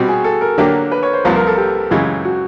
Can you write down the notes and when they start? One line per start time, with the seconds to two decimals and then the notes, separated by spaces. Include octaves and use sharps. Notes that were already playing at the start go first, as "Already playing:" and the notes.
Already playing: B2 G3 C4 F#4
0.08 G#4
0.24 A4
0.41 A#4
0.58 D3 F#3 A#3 D4 G4
0.91 B4
1.03 C#5
1.13 C5
1.25 C2 C3 F3 A#3 B4
1.36 A#4
1.47 A4
1.57 G4
1.91 F#2 C#3 E3 G#3
2.25 F#4